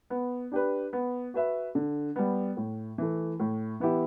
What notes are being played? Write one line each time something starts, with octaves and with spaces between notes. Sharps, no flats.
B3
D4 G4 B4
B3
F#4 B4 E5
D3
G3 B3
A2
E3 A3
A2
E3 B3 E4 G4